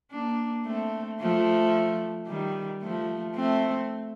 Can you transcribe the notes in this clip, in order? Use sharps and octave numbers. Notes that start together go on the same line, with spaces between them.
A#3 D4
A3 C4
F3 A3
D#3 G3
F3 A3
A3 C4